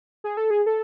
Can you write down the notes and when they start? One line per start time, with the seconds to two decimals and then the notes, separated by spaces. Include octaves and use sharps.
0.24 G#4
0.37 A4
0.50 G#4
0.66 A4